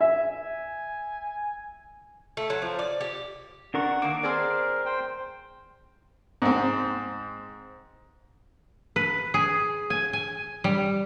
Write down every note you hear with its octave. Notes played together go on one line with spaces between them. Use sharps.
E5 G#5
A3
F#3
F3
D5
G4
D4 A#4 F#5 C#6
D#3 A#3 D6
C4 G#4 A#4 D5
C5 G5
G#2 C4
B4
G#4
G#5
G#5
G3